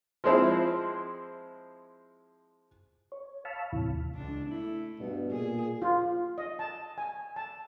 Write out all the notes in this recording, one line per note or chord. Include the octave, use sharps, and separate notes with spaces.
F3 G#3 C4 E4
C#5
F5 A5 B5 C#6 E6 F6
D#2 A2 C3 E3
C#2 D4
A3 E4
G2 B2
A#2 G#4
F4
D#5
A5
G#5
A5